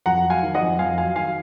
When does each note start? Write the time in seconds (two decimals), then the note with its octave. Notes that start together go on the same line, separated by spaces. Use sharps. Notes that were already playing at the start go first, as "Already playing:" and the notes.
0.06 F2 F#5 A#5
0.24 F#3
0.30 F5 G#5
0.43 D#3
0.54 D#5 F#5
0.61 F2
0.79 F2 F5 G#5
0.98 F#3 F5 G#5
1.16 D#3 F5 G#5